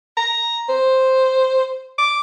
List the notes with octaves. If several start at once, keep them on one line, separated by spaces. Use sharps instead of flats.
A#5
C5
D6